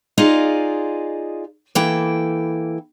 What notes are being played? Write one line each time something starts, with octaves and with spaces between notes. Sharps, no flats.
D#4 F4 G#4 D5 D#5 F5
E3 A#3 E4 A4 G5